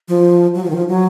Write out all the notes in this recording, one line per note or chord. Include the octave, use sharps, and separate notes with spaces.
F3
F#3
F3
D#3
F3
F#3